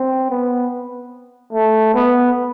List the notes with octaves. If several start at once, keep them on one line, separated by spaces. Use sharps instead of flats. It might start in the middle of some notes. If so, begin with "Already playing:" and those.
Already playing: C4
B3
A3
B3